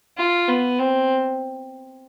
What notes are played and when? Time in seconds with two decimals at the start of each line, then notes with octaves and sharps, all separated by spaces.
0.18 F4
0.48 B3
0.79 C4